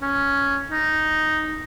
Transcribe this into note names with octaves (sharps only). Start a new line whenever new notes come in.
C#4
D#4